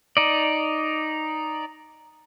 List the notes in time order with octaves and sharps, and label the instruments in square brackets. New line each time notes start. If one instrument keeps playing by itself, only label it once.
[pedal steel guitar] D#4 D5